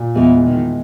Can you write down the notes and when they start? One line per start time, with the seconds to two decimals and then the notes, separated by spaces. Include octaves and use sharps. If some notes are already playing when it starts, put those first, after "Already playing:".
Already playing: A#2
0.15 E2 E3 G#3
0.45 A#2 D#3